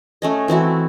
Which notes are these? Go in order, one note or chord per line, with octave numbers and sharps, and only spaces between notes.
A3 C#4 D#5
E3 C4 E4 F#4